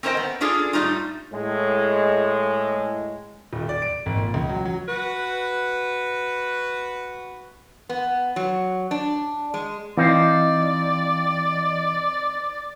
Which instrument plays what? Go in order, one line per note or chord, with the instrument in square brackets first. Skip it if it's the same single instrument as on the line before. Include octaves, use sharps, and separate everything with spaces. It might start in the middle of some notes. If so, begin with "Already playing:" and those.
[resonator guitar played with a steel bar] C4 C#4 A#4 C5 D#5 G5
B3
C#4 D4 F4 G#4 A4
A2 G3 A#3 D#4 F4
[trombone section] A2 G#3
[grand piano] D#1
D5
D7
G#1
A#2
C#2
F#3
F#3
[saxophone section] F#4 B4
[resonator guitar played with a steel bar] B3
F#3
D4
G#3
[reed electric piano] E3 D#5 D6 [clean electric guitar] C4 D#4 F5 [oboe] D5